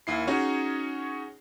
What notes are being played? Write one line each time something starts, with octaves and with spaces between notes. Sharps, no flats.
D#2 E4 C7
C#4 D#4 F#4 G#4 C#5